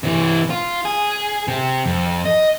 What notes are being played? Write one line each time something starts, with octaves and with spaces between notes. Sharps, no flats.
C3 E3
F4
G#4
C3
F2
D#5